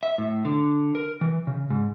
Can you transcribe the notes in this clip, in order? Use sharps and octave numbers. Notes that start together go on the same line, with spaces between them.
E5
A2
D3
A#4
E3
C#3
G#2